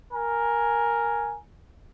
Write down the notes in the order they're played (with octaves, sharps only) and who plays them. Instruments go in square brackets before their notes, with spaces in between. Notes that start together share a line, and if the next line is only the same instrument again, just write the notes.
[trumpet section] A#4 G#5